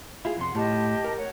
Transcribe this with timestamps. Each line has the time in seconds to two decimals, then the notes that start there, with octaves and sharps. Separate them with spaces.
0.25 E4 F4 G#4
0.37 F2 C3 F#5 C6
0.55 A2 G4 D#5 A5
1.04 A#4
1.17 C#5 F#5